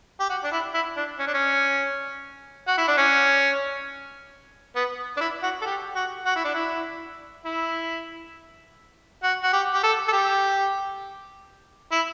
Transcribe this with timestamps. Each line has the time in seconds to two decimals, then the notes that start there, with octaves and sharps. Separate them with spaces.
0.20 G4
0.29 F#4
0.44 D4
0.52 E4
0.74 E4
0.97 D4
1.19 C#4
1.27 D4
1.34 C#4
2.68 F#4
2.78 E4
2.88 D4
2.97 C#4
4.76 B3
5.17 D4
5.21 E4
5.43 F#4
5.62 A4
5.66 G4
5.95 F#4
6.25 F#4
6.36 E4
6.45 D4
6.55 E4
7.45 E4
9.23 F#4
9.43 F#4
9.53 G4
9.74 G4
9.83 A4
10.08 A4
10.12 G4
11.92 E4